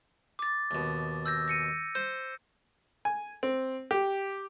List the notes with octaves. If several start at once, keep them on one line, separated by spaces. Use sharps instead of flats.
D6 A6
D#2 B2
E6 G6 A#6
A#6 C#7 D#7
C5 G6
G#5
C4
G4